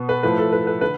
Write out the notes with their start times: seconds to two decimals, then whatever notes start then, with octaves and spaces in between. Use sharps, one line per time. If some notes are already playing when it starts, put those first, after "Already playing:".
Already playing: B2 B3
0.09 B4
0.23 A2 F3 A3 B4
0.38 A4
0.53 B4
0.67 B4
0.81 D3 B4